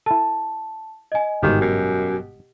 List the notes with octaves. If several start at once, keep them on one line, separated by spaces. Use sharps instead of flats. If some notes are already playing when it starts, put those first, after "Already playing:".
E4 A4 A5
D#5 G#5
G1 G#2 B2 D#3 G4
F#2